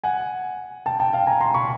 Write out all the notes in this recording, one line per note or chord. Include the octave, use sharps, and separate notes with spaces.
F#5 G#5
G5 A5
G5 A5
F5 G5
G#5 A#5
A#5 C6
B5 C#6